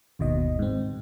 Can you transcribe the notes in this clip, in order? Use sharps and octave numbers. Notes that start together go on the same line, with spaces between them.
G1 D#2 B2 D#3 D#5
G#2 C4